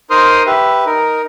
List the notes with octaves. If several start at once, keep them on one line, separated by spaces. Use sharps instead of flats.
D#4 A#4 C5 C6 D#6 F6
G4 B4 E5
D#4 A#4